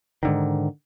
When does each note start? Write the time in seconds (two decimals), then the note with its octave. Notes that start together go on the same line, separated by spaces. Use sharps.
0.23 G#2 D3 D#3